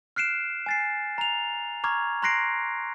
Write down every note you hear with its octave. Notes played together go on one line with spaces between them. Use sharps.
F6 F#6 C7 D7 E7
G#5 A6 C7
A#5 F7
A#5 C#6 D6 F6 G#6
A#5 C6 F#6 A#6 C7 D7